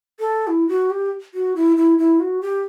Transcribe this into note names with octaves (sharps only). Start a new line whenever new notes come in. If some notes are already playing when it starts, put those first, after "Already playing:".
A4
E4
F#4
G4
F#4
E4
E4
E4
F#4
G4